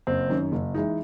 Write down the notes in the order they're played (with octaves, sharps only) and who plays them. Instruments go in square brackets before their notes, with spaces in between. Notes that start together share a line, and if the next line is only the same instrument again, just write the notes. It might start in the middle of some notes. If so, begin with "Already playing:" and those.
[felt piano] F#1 [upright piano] C4
[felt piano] F#2 D#3
F#1
E3 G#3 D#4